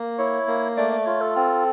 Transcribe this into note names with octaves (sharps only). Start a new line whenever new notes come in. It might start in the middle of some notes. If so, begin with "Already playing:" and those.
Already playing: A#3
E4 C#5
A#3
A3 D5
D5
F4 C#5
A4
C4